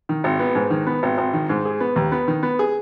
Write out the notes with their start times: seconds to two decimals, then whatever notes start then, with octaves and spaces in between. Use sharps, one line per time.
0.09 D#3
0.24 G#1
0.39 B3
0.55 G#2
0.70 D#3
0.87 B3
1.03 G#1
1.18 G#1
1.34 D#3
1.49 G#2
1.65 G#4
1.80 B3
1.96 D#2
2.12 B3
2.28 D#3
2.43 B3
2.59 G#4